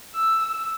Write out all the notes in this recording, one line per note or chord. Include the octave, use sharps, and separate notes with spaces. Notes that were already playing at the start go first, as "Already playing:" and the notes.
E6